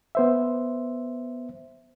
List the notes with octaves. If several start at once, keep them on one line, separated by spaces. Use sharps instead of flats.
B3 C5 E5